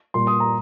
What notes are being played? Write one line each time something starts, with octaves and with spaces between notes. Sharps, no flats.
A#2 G3 A#3 C6
D#6
A#5